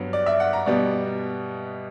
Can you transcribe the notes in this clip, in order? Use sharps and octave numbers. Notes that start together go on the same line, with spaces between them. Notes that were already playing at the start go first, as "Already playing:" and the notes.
Already playing: G2 F#3 B3
D5
E5
F#5
A#5
B2 G3 B3 D5